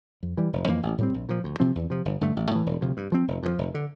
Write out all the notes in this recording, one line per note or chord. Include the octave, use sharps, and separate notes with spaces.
F2
E3 G3
F1
F2 E3 A#3
A1
A2 G3 C4
A#1
A#2 F3
D2
C3 F3 C4
E2
C3 F3
G1
G2 D3 A3
A1
A2 E3
E1
D2 C3 F3
G2
F3 C4
F1
F2 D3 F3
F1
D3